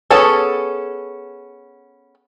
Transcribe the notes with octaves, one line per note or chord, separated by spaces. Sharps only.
B3 C#4 G#4 A4